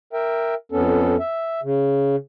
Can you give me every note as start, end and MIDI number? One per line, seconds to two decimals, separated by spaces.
0.13 0.55 70
0.13 0.55 76
0.13 0.55 79
0.72 1.16 41
0.72 1.16 59
0.72 1.16 61
0.72 1.16 69
1.20 1.60 76
1.63 2.16 49